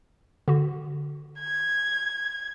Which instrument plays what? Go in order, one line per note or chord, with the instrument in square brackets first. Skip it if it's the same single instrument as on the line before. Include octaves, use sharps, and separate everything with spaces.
[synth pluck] D3 F#4
[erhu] G#6